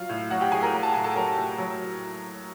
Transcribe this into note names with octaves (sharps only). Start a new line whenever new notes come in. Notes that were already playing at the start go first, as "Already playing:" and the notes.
Already playing: F#3 F4 F5
A2
F#3 F#4 F#5
G4 G5
A2 G#4 G#5
A#4 A#5
F#3 A#5
A5
A2 G#5
A4 A5
F#3 A#4 A#5
A2
F#3